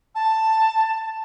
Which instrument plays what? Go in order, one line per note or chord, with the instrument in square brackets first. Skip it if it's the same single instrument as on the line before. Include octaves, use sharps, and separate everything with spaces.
[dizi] A5